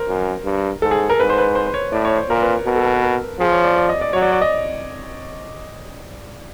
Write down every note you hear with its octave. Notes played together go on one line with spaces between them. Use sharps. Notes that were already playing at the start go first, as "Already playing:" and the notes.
Already playing: A#4 C5
F#2
G2
G#2 A4
G#4
A#4
G#2 B4
C5
B4
C5
C5
C#5
A2 D5
C#5
C5
A#2 A#4
B4
B4
B2 A#4
A4
A#4
B4
A#4
F3 G#4
C#5
D5
D5
D#5
D5
F#3 C#5
D5
D5
D#5